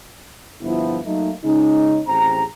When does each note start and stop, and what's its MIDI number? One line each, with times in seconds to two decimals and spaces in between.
0.62 0.97 31
0.62 0.97 53
0.62 0.97 59
0.62 0.97 64
1.05 1.32 54
1.05 1.32 57
1.05 1.32 58
1.05 1.32 63
1.45 1.99 49
1.45 1.99 56
1.45 1.99 61
1.45 1.99 63
2.08 2.44 33
2.08 2.44 60
2.08 2.44 68
2.08 2.44 82